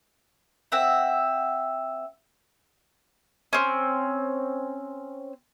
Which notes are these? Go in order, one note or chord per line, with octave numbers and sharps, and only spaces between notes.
C4 E5 F#5
C4 C#4